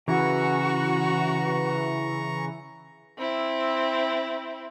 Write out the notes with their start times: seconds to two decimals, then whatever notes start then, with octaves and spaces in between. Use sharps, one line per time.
0.08 C#3 E3 F#4 A#5 C#6
3.18 C4 E4